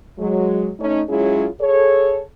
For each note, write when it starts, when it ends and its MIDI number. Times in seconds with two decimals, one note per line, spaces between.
0.19 0.70 54
0.19 0.70 56
0.80 1.03 57
0.80 1.03 61
0.80 1.03 63
1.09 1.47 54
1.09 1.47 56
1.09 1.47 61
1.09 1.47 64
1.09 1.47 65
1.09 1.47 68
1.61 2.22 68
1.61 2.22 69
1.61 2.22 73